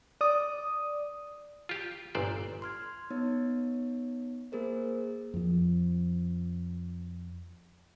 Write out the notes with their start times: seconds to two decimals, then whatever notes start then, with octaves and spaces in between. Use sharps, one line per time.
0.21 D5 D#6
1.69 F4 G4
2.15 G1 A#2 C5 D5
2.62 C6 F6 G#6
3.10 B3 D#4 C#5
4.52 A#3 G#4 A#4 C5
5.34 F2 F3